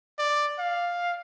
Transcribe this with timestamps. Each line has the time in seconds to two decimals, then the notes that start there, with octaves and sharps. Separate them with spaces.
0.19 D5
0.59 F5